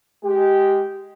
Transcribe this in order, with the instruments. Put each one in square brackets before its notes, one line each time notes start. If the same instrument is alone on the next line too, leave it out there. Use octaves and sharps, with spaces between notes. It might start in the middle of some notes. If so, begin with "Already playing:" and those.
[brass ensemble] G#3 G4